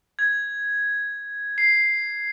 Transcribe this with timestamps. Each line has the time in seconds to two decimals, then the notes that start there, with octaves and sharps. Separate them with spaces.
0.19 G#6
1.58 C7